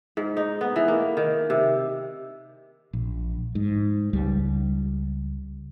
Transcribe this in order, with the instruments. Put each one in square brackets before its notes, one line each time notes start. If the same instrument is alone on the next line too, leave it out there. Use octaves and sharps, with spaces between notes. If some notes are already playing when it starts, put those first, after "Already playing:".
[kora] G#2
D#4
B3
E3
A#3
D#3
C3
[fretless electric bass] A#1
G#2
C#2 G3